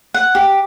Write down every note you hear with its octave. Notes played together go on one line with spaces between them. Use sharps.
F#5
G4